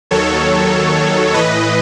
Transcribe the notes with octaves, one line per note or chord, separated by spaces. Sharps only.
D#2 D#3 F#3 A4 C#5
A2 E3 B4 D#5